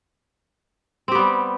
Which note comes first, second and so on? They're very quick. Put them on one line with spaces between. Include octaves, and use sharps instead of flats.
C4 G4 B3 G3